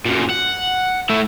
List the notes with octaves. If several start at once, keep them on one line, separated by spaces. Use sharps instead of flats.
F#2 A#2
F#5
A3 E4